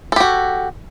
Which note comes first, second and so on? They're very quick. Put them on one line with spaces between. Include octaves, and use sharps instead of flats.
A4 G4 F#4